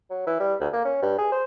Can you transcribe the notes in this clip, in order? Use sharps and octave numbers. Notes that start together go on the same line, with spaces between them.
F#3
E3
G3
D2
A#3
C#4
G2
G#4
C5